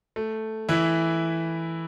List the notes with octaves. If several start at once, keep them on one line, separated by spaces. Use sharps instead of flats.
A3
E3 E4